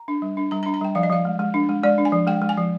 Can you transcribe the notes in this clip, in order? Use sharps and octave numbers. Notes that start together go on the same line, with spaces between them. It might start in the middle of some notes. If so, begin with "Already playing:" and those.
Already playing: A#5
D4
G3
D4
G3 A#5
A#5
D4
A#5
G3 G5
F3 F5
D#5
F3 F5
G#3
G#3
D4
G#3
G#3 D5
D4
G#5
F3
G#3 G5
G#3
G#5
F3